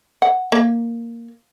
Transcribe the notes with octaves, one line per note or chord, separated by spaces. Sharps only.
F#5
A#3